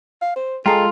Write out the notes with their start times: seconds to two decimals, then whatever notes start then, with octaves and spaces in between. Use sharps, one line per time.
0.22 F5
0.36 C5
0.66 G#3 F4 A4 G5 A#5 C7